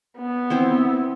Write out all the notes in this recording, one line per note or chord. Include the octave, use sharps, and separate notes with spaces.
B3
C4 E4 C5